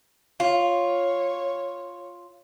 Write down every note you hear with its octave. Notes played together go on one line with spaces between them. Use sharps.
F4 C#5